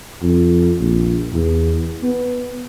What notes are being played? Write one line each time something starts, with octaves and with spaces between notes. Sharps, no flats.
F2
A#1
E2
B3